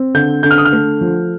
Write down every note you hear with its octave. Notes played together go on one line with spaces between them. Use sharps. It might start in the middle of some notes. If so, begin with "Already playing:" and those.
Already playing: C4
D3 G6
D3 G6
F6
D#6
F6
A3
F3